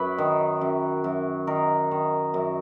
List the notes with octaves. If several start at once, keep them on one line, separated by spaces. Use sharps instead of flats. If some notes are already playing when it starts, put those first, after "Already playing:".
Already playing: F#2 B4
D#3
F#2
F#2
D#3 A#4
D#3
F#2